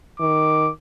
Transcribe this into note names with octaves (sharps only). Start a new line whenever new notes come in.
D#3 D6